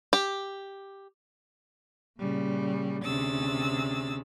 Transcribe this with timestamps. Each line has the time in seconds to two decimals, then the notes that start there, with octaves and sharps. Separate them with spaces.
0.13 G4
2.20 A#2 C#3 G3
3.04 D2 C3 C#4 G#4 E6 A6